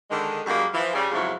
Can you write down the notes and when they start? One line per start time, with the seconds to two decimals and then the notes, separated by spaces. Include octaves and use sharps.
0.10 D3 D#3 G#3
0.46 F#2 G3 G#3 A#3 F#5
0.73 E3 F3
0.93 C#3 G3 G#4
1.12 F2 G#2 C#3 F#3 E4 F4